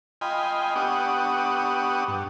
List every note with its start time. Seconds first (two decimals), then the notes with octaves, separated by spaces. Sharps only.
0.21 F4 D#5 G5 G#5 B5 C6
0.75 B3 D4 G4 F#5 C#6 D#6
2.08 G2